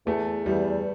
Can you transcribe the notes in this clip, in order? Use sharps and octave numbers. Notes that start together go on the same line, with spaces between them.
E2 A3
E2 G3